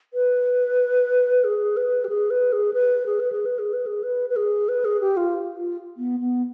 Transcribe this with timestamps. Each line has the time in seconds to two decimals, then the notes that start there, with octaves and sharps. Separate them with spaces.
0.14 B4
1.44 G#4
1.77 B4
2.05 G4
2.09 G#4
2.30 B4
2.53 G#4
2.74 B4
3.06 G#4
3.20 B4
3.32 G#4
3.46 B4
3.59 G#4
3.73 B4
3.87 G#4
4.03 B4
4.30 B4
4.36 G#4
4.69 B4
4.85 G#4
5.01 G4
5.17 F4
5.54 F4
5.97 B3
6.20 B3